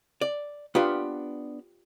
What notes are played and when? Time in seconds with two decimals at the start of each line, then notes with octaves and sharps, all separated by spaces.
0.21 D5
0.75 B3 D4 F4 G4 B4